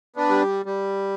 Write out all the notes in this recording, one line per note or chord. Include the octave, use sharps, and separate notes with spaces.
B3 D4
G3
G3